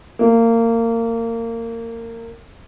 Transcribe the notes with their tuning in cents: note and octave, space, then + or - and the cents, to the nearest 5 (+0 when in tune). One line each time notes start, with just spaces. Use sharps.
A#3 -25